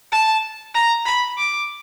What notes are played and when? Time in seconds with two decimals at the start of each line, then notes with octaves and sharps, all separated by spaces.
0.12 A5
0.75 A#5
1.06 B5
1.38 D6